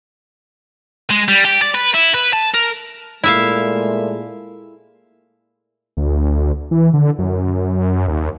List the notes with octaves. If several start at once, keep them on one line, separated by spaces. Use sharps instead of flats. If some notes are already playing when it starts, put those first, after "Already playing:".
G#3
G3
G4
D5
B4
E4
B4
A5
A#4
A#2 G#3 A3 E4 E5 F5
D2
E3
D3
F#2
D#2